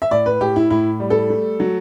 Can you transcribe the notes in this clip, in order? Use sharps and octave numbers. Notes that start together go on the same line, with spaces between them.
E5
A2 D5
B4
A2 G4
E4
A2 E4
G3
A4
A3
F#3